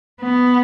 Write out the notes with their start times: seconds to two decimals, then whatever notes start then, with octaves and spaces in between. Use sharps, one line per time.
0.21 B3